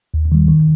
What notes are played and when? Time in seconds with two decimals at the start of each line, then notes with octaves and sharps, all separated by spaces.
0.14 D#2
0.32 D#3 G3
0.49 D#3